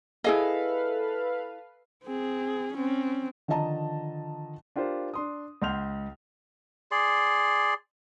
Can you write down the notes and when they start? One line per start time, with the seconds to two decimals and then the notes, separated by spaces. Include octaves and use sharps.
0.24 E4 G#4 A4 B4 D#5 F5
2.04 C4 G#4
2.73 C4 C#4
3.48 D3 D#3 F3 D#5 A5 A#5
4.76 D4 F4 G4 A#4 C5
5.14 D4 C6 D#6
5.62 C#2 F#5 C6 F6 G6 F7
6.91 G#4 D5 C6